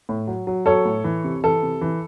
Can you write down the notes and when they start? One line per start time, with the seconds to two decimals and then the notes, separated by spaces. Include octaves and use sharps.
0.09 A2
0.27 F#3
0.47 F#3
0.66 F#3 A4 C#5
0.85 A2
1.04 E3
1.24 C3
1.44 E3 A4
1.63 C3
1.81 E3